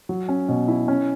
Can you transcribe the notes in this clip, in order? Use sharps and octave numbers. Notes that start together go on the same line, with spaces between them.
F#3
C#4
B2
E4
C#4